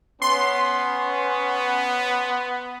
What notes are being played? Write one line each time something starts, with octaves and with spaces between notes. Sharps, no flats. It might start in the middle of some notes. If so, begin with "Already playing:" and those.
B3 C#4 C6